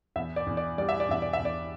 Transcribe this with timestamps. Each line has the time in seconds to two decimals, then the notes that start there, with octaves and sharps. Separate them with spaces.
0.16 E2 E5
0.36 D5
0.47 E2
0.57 D5
0.78 G3 D5
0.89 E5
1.00 D5
1.09 E2 E5
1.22 D5
1.33 E5
1.39 E2
1.45 D5